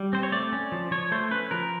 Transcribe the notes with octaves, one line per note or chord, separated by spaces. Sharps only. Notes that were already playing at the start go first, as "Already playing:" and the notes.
Already playing: G3
C4 C5
C#5
A3 D5
C#4
F3
F3 C#5
A3 C5
C#4 B4
F3 A#4